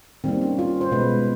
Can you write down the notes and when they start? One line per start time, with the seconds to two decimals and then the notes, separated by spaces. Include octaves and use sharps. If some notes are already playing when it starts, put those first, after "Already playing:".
0.24 D#3 G3 A#3 C4
0.42 C#4
0.59 F4
0.81 C5
0.91 B2 G#3 B4